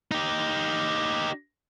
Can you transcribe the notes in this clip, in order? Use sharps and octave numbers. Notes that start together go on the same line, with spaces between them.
D#4 G4